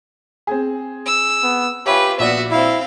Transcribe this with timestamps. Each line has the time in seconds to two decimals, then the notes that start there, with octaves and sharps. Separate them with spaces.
0.47 C4 G#4
1.06 E6
1.43 B3
1.86 F4 G4 B4 C#5 E5 G#5
2.19 A#1 B3 F#4 D5 E5
2.51 C4 E4 F5